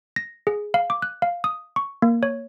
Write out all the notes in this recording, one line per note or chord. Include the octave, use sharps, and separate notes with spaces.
A#6
G#4
F5
D6
F#6
F5
D#6
C#6
A#3
C#5